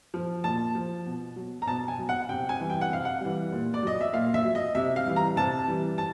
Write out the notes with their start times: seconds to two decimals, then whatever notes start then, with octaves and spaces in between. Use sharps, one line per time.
0.14 F3
0.44 A#2 A5
0.75 F3
1.06 B2
1.36 F#3
1.62 A#5
1.67 B2 A5
1.88 G#5
1.99 F#3
2.09 F#5
2.29 C3 G5
2.49 G#5
2.60 E3 G3
2.70 G5
2.81 F#5
2.90 C3 F5
3.05 F#5
3.21 E3 G3
3.52 A#2
3.74 D5
3.83 F#3 D#5
4.01 E5
4.13 A#2 F5
4.34 E5
4.44 F#3
4.55 D#5
4.75 C3 E5
4.96 F5
5.06 E3 G3
5.16 A#5
5.36 C3 A5
5.68 E3 G3
5.98 A5